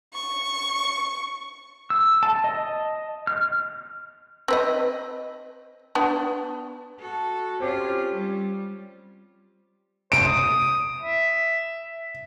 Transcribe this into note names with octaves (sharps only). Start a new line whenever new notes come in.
C#6
E6
A5
D#5
F6
C4 B4 D#5
B3 D4
F#4 A4
C4 C#4 F4 G4 C#5
G3
C5 D7
D#6
E5